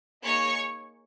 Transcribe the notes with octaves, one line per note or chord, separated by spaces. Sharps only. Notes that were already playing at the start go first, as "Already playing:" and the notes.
A#3 D#4 G#4 C#5 C#6